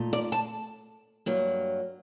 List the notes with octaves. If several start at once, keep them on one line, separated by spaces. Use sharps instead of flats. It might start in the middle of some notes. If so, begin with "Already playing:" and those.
Already playing: A#2 A3 D#4
D5
A5
G2 F#3 A#3